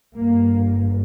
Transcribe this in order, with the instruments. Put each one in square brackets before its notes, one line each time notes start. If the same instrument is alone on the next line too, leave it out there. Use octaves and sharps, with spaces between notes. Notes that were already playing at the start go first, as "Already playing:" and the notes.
[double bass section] G1 G2 A#3